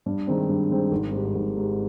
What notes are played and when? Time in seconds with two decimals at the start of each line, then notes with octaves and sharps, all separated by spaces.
0.06 G2
0.27 D#3 G#3 C4
0.49 G2
0.70 D#3 G#3 C4
0.92 G#1
1.12 G#2 G3
1.34 G#1
1.56 G#2 G3